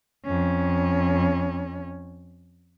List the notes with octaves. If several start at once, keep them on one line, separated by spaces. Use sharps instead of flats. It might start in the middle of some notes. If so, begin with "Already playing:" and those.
F2 C#4